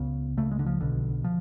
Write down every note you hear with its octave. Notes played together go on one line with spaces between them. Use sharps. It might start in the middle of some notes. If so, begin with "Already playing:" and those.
Already playing: C#2 C#3 B3
C#2 C#3 A3
G#3
D3
F3
B1 B2 D3
F3